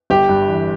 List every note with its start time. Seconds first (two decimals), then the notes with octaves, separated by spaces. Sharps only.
0.10 G1 G4
0.29 G2
0.48 E3